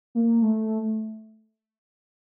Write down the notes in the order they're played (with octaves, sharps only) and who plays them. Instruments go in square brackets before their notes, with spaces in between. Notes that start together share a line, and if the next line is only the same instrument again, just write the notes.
[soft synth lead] A#3
A3